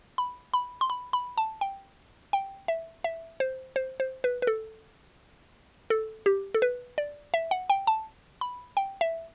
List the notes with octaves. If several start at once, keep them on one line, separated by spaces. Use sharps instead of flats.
B5
B5
C6
B5
B5
A5
G5
G5
E5
E5
C5
C5
C5
B4
B4
A4
A4
G4
A4
B4
D5
E5
F#5
G5
A5
B5
G5
E5